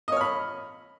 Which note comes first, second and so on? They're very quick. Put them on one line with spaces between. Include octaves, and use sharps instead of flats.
D#5 C#5 F6 B5